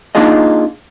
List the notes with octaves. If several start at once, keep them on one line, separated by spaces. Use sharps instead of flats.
A#3 D4 D#4 F4 G#4 D#5